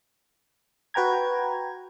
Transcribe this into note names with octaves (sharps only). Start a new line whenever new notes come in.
F#4 B4 G5 A#5 G#6